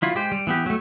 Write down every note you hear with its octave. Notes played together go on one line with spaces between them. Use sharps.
F#3 E4 F4
G#3 G4 C5
G3
E3 B3 G4
F#3 A3